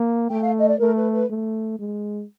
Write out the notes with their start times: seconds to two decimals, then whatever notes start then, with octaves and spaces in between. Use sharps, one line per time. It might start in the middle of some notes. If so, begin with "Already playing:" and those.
Already playing: A#3
0.30 A3 G5
0.43 F5
0.59 D#5
0.68 D5
0.80 A3 A#4
0.97 B4
1.13 B4
1.30 A3
1.79 G#3